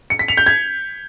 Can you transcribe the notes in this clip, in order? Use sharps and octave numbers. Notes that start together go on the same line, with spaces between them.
C#7
B6
F7
G6
G#6